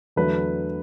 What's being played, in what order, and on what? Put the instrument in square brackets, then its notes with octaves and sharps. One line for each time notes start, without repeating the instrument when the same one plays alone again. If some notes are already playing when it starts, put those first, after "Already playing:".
[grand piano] E2 D3 F#3 A3 B4